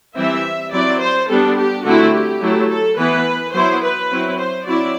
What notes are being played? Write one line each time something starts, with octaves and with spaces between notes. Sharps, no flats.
E3 G3 C4 E4 E5
F#3 C4 E4 D5
C5
G3 B3 D4 A4
G4
D3 A3 C4 E4 F#4
G4
F#3 A3 E4
A4
E3 B3 E4 B4
F#3 B3 E4 C5
B4
F#3 C4 E4
C5
F#3 C4 E4 D5